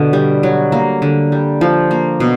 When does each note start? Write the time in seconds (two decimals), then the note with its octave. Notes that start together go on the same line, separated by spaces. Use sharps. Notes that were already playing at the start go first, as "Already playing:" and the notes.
Already playing: B2 D3
0.13 G3
0.43 F#3
0.72 A#3
1.02 D3
1.32 G3
1.61 F3
1.91 A#3
2.20 B2